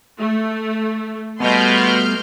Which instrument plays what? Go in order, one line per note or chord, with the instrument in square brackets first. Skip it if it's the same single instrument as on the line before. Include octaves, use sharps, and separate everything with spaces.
[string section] A3
[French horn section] B2 [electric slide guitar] G3 A3 B3 [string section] C6 F6 G6